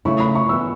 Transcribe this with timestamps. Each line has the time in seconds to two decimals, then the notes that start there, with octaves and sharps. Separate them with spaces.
0.05 C#3 A3 E4 C#6
0.20 B5
0.35 C#6
0.49 E3 B3 E4 E6